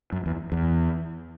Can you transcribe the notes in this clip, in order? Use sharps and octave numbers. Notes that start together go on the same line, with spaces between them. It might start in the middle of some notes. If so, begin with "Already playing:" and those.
F#2
E2
E2